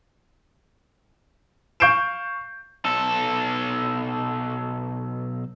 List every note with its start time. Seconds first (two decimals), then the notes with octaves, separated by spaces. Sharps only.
1.80 F5 C#6 G6 C7 D7 E7
2.85 B1 A4